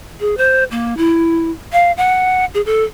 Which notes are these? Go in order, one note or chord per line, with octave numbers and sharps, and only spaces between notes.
G#4
C5
A#3
E4
F5
F#5
G#4
A4